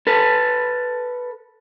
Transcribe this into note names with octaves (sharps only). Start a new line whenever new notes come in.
A4 B4